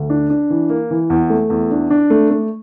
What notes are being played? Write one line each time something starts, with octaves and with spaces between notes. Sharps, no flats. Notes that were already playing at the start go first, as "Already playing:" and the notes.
Already playing: D2
D4
D4
E3
A#3
E3
E2
A3
E2
D4
D4
A3
A3